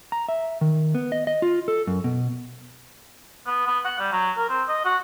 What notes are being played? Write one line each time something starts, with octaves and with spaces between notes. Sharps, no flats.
A#5
E5
D#3
B3
D#5
D#5
F4
A4
F#2
B2
B3
B3
F#5
G3
F#3
A#4
C4
D#5
F#4